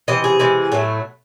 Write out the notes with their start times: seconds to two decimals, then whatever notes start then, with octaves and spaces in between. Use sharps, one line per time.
0.08 C3 E3 D#5
0.24 G#4
0.39 C3 E3 G#3
0.72 A2 F#3 A3